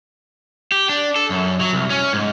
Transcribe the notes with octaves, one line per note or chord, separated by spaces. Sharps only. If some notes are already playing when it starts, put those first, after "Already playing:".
G4
D4
A4
F#2
F#3
C2
C#4
G#2